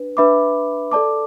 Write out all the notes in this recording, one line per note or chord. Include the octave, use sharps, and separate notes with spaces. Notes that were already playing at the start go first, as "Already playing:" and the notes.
Already playing: D4 B4
D4 B4 E5 B5 D6
A4 D5 A5 D6